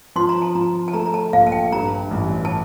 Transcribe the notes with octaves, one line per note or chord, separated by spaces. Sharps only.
F3 C6
A#5
A5
F3 A#5
A5
A3 A#5
A#5
A5
A#1 F5
A5
G5
G2 A#5
A1
A5